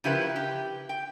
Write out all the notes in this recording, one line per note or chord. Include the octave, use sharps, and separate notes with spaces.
C#3 F3 E4 G4 A#4 B4
G4
G5